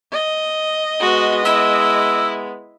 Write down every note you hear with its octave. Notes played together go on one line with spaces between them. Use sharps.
D#5
G#3 B3 F#4
E4 E6